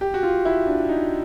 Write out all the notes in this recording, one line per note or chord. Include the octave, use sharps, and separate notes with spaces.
G4
F#4
F4
E4
D4
D#4